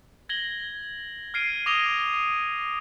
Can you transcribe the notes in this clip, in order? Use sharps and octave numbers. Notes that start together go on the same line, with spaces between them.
G#6 A#6 F#7 G7
F6 G#6 C7 D7 D#7
D6 D#6 A#6 D#7 F7 G7